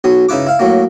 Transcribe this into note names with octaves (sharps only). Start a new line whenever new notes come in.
B1 F#3 D#6
C#3 D#4 E4 B4 D6
E4 F5
A2 F#3 A#3